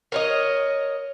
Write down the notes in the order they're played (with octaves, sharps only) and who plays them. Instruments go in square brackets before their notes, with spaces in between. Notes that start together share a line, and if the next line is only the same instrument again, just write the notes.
[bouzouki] A#4 C#5 D#5